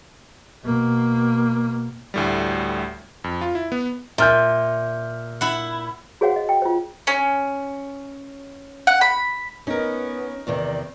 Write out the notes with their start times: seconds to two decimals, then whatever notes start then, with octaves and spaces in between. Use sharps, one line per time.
0.63 B2 A#3
2.14 D2 A2 G3
3.24 F2
3.41 F4
3.55 E4
3.72 B3
4.18 A#2 E5 F6 G6
5.41 E4 F#5
6.21 F#4 G#4 C5 C#5 F5 F#5
6.36 D#5
6.49 G5
6.62 F4 C5
7.07 C#4
8.87 F#5
9.01 B5
9.67 B3 C#4 D#4 A#4
10.47 E2 C3 D#3 D5